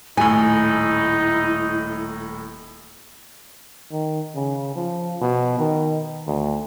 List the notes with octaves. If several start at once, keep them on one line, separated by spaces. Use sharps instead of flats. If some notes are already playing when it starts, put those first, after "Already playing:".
D#1 A2 D#4 E4 G#5
D#3
C#3
F3
B2
D#3
D2